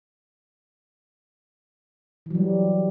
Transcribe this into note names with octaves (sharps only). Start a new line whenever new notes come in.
E3 F#3 G3